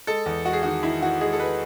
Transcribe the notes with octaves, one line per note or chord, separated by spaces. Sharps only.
G#3 A4
E2
G#3 F#4
G#4
D#3 F#4
D#3 E4
D#3 F#4
G#3 G#4
A4
G#3 B4